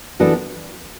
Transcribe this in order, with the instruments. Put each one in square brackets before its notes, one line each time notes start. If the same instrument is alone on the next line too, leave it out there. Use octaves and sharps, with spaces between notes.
[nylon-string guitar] E3 B3 D4 F#4 A4